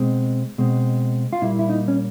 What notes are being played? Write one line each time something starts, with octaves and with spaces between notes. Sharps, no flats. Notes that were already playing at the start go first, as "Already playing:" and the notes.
Already playing: B2 G#3 C4
B2 G#3 C4
F4
A#2 G3 A#3 E4
E4
D#4
C#4